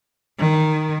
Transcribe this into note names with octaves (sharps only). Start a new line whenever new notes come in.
D#3